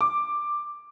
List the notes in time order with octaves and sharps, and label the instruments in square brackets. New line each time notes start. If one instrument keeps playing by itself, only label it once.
[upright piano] D6